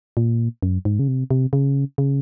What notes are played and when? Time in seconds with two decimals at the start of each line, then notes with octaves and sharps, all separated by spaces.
0.17 A#2
0.63 F#2
0.85 G#2
0.99 C#3
1.08 C3
1.31 C3
1.53 C#3
1.98 C#3